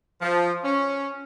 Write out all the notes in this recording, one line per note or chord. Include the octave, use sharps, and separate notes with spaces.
F3
C#4